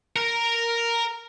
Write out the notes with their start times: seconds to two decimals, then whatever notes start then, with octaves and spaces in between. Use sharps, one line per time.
0.16 A#4